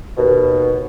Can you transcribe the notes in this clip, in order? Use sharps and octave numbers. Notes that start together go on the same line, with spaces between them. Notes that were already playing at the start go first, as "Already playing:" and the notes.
D#2 B2